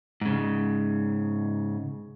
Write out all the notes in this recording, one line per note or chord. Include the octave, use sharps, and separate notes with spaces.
G#2 C#3